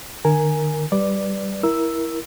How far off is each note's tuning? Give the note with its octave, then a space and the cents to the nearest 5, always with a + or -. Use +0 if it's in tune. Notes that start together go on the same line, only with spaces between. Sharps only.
D3 +45 A#4 +0 G#5 +0
G3 +0 B4 +0 D5 +0
E4 +0 A#4 +15 E6 +0